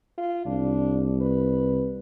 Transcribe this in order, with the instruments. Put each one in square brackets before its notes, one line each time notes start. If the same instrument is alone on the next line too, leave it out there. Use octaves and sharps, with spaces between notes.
[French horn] F4
[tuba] C2 [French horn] D4
[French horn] B4